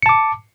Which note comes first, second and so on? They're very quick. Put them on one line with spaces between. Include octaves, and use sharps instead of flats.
C#7 A5 D6